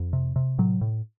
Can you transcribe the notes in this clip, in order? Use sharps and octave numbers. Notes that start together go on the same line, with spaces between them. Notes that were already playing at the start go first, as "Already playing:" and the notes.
Already playing: F2
C3
C3
A2 F#3
A2